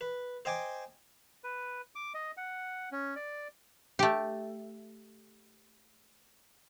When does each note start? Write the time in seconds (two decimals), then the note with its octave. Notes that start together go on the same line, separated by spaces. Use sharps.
0.01 B4
0.45 C5 D#5 G5 G#5 D6
1.44 B4
1.95 D6
2.14 D#5
2.37 F#5
2.92 C#4
3.16 D5
3.99 A3 G4